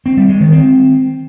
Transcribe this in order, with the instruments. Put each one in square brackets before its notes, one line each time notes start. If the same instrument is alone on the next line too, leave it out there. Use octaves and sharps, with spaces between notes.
[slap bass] C4
G3
G#3
D#3
C4